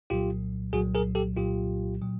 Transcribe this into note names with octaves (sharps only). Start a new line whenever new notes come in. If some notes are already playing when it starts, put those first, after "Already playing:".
C2 A#2 F#3 F4 G4
C2 A#2 F#3 F#4 G#4
G#4 A#4
G4 A4
C2 A#2 F#3 F4 G4
A#2 F#3